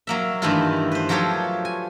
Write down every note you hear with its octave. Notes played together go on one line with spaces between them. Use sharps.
F#3 A#3 E5
G2 D#3 E3 A3 E4 F4
B4 C5
F3 F#3 F4 G4 A4 C#5
G#5